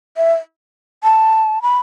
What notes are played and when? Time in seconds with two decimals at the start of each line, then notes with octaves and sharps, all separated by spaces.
0.17 E5
1.04 A5
1.62 B5